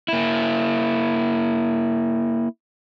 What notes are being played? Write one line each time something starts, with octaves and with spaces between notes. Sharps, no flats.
A#3 E4